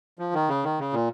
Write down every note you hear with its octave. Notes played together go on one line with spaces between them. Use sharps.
F3
D#3
C#3
D#3
C#3
A#2